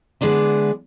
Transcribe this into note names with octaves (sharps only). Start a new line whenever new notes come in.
D3 G#3 B3 D4 E4